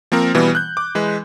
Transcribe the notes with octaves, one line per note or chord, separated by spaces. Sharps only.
F3 A#3 C4 A#4
B2 E3 G3 B3
F#6 G6
D6
E3 G#3 B4